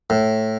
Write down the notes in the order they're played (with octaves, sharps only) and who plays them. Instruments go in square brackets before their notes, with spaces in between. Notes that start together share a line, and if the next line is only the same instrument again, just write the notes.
[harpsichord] A2